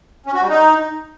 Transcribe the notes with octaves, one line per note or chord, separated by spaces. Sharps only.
C#4
F#4
G3
D#4